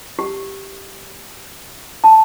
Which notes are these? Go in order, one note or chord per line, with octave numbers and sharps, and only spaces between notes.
G4
A5